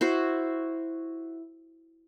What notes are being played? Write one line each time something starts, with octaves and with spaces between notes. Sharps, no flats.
E4 F#4 C5